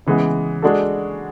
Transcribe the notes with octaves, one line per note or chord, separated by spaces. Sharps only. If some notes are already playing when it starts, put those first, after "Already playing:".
C#3 E3 G#3 B3
G#3 D4 F#4 A4